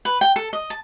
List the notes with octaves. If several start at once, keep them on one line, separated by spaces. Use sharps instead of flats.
B4
G5
A4
D#5
A5